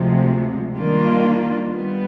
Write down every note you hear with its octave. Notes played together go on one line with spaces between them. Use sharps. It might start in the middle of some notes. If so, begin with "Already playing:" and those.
Already playing: D2 C3 F3 G#3
D#3 G3 A#3 D4 F4
G3 B3